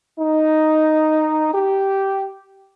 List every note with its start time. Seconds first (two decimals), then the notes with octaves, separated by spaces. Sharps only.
0.19 D#4
1.54 G4